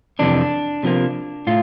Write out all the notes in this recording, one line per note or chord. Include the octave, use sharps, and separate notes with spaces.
F2 C3 E3 D4
C3 F3 A#3
A2 F4